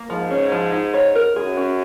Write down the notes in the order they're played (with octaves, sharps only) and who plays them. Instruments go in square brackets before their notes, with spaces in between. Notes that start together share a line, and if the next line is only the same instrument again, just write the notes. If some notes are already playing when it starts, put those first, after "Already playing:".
Already playing: [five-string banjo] A#3
[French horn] G#2 [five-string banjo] F3
[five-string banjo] C#4
F3
D#4
C#5
A#4
[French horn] F#2 [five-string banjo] G#4
[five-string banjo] C#4